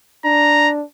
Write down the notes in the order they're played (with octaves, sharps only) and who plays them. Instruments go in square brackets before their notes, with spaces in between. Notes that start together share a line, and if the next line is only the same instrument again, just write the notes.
[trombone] D4 [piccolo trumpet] A#5